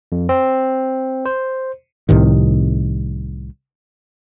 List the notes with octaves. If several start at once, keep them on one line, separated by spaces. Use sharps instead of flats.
F2
C4
C5
C2 A2 C3 D#3